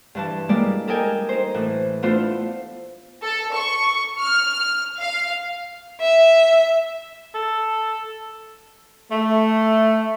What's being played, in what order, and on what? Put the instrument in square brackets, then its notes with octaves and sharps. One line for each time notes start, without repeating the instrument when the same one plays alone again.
[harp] G2 E3 A5
G3 G#3 A#3 E4 D5
A4 A#4 D#5 G5 G#5
D#4 C5
A2 E3
A3 B3 D4 E4 F4 C5
[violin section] A4
C#6
F6
F5
[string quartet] E5
[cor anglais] A4
[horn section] A3